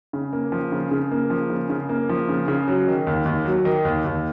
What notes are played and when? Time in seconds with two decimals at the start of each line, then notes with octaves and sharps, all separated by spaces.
0.13 C#3
0.33 A#3
0.52 F3
0.72 C#3
0.91 C#3
1.11 A#3
1.30 F3
1.50 C#3
1.70 C#3
1.89 A#3
2.09 F3
2.29 C#3
2.48 C#3
2.68 F#3
2.87 D#3
3.07 D#2
3.26 D#2
3.45 F#3
3.65 D#3
3.85 D#2
4.05 D#2